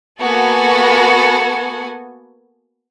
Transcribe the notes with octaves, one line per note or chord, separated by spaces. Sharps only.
A#3 B3 F#4 A4 G#5